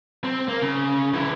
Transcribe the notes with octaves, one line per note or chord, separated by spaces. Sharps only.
C4
A#3
C#3
D3 E3